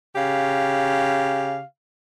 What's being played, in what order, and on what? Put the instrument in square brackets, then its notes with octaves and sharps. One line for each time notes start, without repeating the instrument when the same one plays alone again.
[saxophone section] C#3 G4 F5